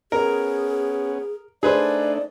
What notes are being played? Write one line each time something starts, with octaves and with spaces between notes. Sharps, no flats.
B3 C#4 G#4 A#4
A3 D4 D#4 G#4 B4 C5 D5